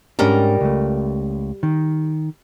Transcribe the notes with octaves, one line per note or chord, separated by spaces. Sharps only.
G#2 G3 C#4 D4 A#4 D#5
C#2 A3
D#3